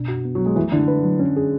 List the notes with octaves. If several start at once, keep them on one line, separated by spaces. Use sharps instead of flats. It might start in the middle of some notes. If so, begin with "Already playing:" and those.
Already playing: B2 D4
F#4
B3
F#3
G#3 B3
E3 A3
D3 E4
B4
F#3
C#4
G#4